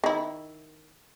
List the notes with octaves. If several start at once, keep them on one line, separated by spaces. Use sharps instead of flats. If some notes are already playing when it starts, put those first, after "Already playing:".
D#3 E4